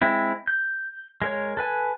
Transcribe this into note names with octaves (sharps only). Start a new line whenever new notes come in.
G#3 C4 E4
G6
G#3 A#4 C#5
A4 B4 G#5